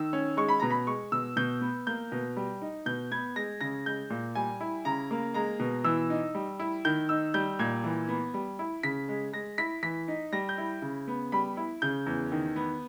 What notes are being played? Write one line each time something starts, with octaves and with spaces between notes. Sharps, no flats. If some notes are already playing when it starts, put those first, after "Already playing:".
Already playing: D#3 E6
C#4
G#3 C#6
B5
B2 A#5
B5
G#3 C#6
B2 E6
B2 G6
B3
A#3 G6
B2
G3
D#4
B2 G6
B3 G#6
G#3 A#6
C#3 A#6
G#3 G6
A#2
G3 G#5
E4
C#3 A#5
A#3
G#3 A#5
B2
E3 E6
D#4
G3
E4
D#3 G6
D#4 E6
G3 G6
A#2 G#6
E3
B3
G3
E4
C#3 B6
G#3
G#3 A#6
E4 B6
E3 B6
D#4
G3 A#6
G6
E4
C#3
B3
G3 B5
E4
C#3 G6
E2
D#3
B3